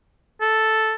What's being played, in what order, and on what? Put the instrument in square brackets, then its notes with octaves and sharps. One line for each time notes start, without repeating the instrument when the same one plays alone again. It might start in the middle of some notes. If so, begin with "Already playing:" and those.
[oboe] A4